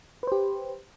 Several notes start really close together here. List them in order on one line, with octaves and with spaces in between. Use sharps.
B4 C5 G4